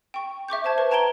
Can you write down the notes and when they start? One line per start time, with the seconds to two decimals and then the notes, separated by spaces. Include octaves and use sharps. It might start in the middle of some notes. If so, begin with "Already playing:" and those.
0.14 G5 C#6
0.48 E5 C#6 D6 G6
0.64 C5 E5 A5 G#6
0.78 B4
0.91 G5 A5 A#5 G#6 D7 G7